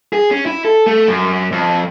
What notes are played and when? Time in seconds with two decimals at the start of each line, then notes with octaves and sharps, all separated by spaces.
0.13 G#4
0.31 C#4
0.46 E4
0.65 A4
0.87 A3
1.08 F#2
1.52 F2